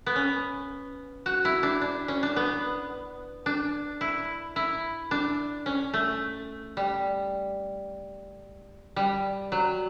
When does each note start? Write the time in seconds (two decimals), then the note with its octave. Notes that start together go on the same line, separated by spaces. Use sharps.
0.06 B3
0.16 C#4
1.26 F#4
1.45 E4
1.63 D4
1.81 D4
2.08 C#4
2.23 D4
2.36 B3
3.46 D4
4.01 E4
4.56 E4
5.11 D4
5.66 C#4
5.94 A3
6.77 G3
8.96 G3
9.52 F#3